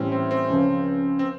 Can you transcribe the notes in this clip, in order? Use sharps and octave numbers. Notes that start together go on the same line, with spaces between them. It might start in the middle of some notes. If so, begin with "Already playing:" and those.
Already playing: A2 E3 G3 C4 C#4
C4
C4
C#2 C#3 F3
C4